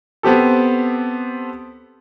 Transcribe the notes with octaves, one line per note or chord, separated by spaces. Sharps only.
B3 C4 G4 A4